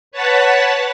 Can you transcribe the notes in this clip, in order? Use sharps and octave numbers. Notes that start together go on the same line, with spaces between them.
B4 C#5 F#5 A5 A6 B6